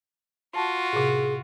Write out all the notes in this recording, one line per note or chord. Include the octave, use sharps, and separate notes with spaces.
F4 F#4 A5
A2 C3 G#4